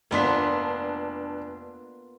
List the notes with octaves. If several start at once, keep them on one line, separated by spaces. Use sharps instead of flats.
F1 A#3 B3 D4 F4 B6